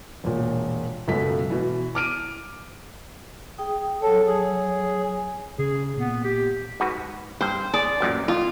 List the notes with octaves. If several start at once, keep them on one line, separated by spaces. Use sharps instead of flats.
E1 A#2
C#2 F#2 B2 A3 B6
B2 E3
D6 F6 D7 D#7
G#4 G5 D#6
F#3 A4 C#5
G#4
G#5
C#3 G#4
A#2 B3
G4
G#2 F#4 B4
G2 C5 G5
G#4 D5
A1 F#2 A#2
F2 F4